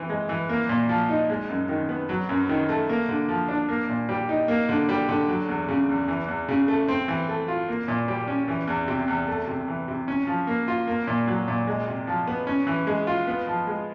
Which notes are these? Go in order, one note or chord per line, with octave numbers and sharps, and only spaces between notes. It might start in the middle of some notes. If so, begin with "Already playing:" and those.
Already playing: E3 C4
G#3
E3
A#3
A#2
F3
D#4
G#3
F#2
D#3
B3
F#3
F#2
D#3
A3
A#3
D3
F3
D4
A#3
A#2
G3
D#4
A#3
D3
G3
D3
F#3
E2
C#3
E2
E3
E2
C#3
A3
C4
E3
A3
F4
A#3
A#2
G3
C#4
E3
E2
C3
E2
A3
C3
E3
C3
C#4
F3
A#3
F4
A#3
A#2
F#3
A#2
G#3
C3
F3
B3
C#4
E3
G#3
F4
B3
F3
G#3